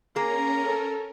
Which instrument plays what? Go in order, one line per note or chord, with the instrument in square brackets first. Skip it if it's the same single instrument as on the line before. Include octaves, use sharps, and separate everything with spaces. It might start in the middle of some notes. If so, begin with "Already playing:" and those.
[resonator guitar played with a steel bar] A#3 G#4 [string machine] C#4 A#4 [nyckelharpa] A#5
[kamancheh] A4